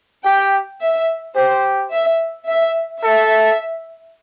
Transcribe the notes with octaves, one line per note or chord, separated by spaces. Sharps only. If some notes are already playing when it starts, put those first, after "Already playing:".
G4 G5
E5
G4 C5
E5
E5
A4 E5